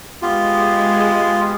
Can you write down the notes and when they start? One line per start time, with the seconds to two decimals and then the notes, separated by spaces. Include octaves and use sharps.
0.22 G#3 B3 F4 G4